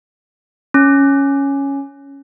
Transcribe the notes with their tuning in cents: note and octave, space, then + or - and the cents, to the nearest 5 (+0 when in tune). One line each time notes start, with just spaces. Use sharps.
C#4 +0